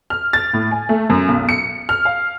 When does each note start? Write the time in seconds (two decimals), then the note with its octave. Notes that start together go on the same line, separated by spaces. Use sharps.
0.10 F6
0.33 A6
0.53 A2
0.71 G#5
0.89 A3
1.10 F#2
1.28 B1
1.49 C#7
1.89 F6
2.05 F5